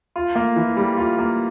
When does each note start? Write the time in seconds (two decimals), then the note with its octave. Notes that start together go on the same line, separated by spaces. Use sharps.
0.16 F4
0.35 A#3
0.56 E3
0.77 G3
0.97 F4
1.19 A#3